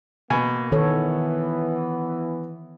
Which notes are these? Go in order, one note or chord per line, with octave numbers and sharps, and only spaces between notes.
B2 A#3 G#5
D#3 E3 B3 A4 C#5